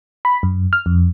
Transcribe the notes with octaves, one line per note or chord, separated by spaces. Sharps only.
B5
F#2
F6
F2